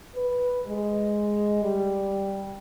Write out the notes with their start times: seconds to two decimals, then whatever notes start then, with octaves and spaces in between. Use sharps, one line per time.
0.15 B4
0.65 G#3
1.63 G3